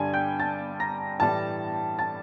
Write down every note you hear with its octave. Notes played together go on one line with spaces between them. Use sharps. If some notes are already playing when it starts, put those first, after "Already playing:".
Already playing: G2 D3 G3 G#5 G#6
G5 G6
A5 A6
A#5 A#6
A2 E3 G3 A5 A6
A5 A6